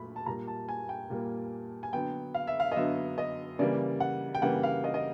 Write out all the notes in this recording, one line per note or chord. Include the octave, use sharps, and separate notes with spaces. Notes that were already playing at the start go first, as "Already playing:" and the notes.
Already playing: A#2 F#3 A3 B5
A5
A#2 G3 A#3 A#5
A5
G#5
G5
A#2 G3 A#3
G#5
D3 F#3 B3 G5
F5
E5
F5
D#5
D3 F#3 B3 E5
D#5
C#3 E3 G3 A#3 D5
F#5
G5
C#3 E3 G3 A#3 F#5
F5
D#5
D#5